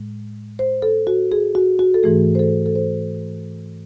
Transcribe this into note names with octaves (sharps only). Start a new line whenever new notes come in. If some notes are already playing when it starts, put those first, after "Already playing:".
Already playing: A2 G#3
C5
A4
F#4
G#4
F#4
F#4
A4
G#2 E3 A3 G#4
C5
A4
A4
C5